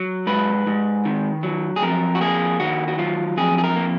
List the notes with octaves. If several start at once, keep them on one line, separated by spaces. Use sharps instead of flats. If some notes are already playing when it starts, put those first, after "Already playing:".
Already playing: F#3
G#2 B4
G#2
D#3
F#3
G#4
F2 A#4
F#4
A#3 G#4
D#3 F#4
F#4
F#3 F4
F2 G#4
G#4
A#4
A#3